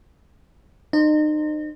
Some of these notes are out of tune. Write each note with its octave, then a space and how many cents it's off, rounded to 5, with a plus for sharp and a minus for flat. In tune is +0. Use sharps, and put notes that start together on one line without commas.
D#4 -35 C5 +0